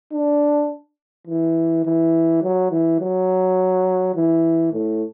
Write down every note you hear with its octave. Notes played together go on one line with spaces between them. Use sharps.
D4
E3
E3
F#3
E3
F#3
E3
A2